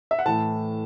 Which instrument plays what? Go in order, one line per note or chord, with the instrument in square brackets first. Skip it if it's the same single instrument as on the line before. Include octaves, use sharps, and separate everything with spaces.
[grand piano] E5
F#5
A2 E3 A3 A5